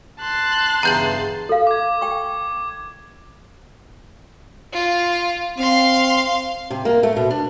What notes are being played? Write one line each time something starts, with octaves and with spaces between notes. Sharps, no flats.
A5 C6 F#6
E2 G2 C#3 A#5 G6 F#7
A4 F5
D6 G#6
G5 C#6
F4
C4 F5 C6
C3
A#3
A3
B2
D4